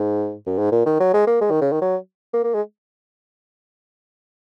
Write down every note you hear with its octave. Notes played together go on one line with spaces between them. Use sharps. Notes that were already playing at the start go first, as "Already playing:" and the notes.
Already playing: G#2
F#2
G#2
A#2
D#3
F#3
G#3
A#3
G#3
D#3
C#3
D#3
F#3
A#3
A#3
G#3